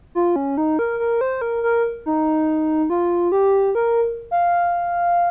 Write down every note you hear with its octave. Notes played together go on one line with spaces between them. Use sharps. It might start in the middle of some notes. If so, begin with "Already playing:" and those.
F4
C#4
D#4
A#4
A#4
C5
A#4
A#4
D#4
F4
G4
A#4
F5